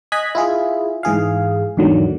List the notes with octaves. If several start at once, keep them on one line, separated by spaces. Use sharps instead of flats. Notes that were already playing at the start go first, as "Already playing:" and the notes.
D#5 G#5 F#6 G#6 B6
E4 F4 G#4
G#2 E3 G#4 F5
E2 G#2 D3 D#3 F#3